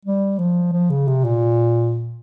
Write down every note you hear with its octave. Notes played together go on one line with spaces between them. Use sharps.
G3
F3
F3
C#3
C3
A#2